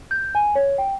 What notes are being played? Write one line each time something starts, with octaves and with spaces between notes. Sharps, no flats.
G6
G#5
C#5
G5